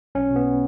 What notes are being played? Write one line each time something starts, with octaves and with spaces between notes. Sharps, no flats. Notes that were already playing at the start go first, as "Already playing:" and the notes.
B1 C#4
B2
B3